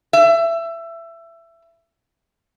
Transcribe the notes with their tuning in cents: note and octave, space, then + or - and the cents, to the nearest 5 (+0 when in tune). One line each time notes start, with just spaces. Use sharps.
E5 +20